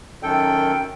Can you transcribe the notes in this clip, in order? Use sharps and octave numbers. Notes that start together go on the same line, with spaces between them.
F#2 D#3 A4 G5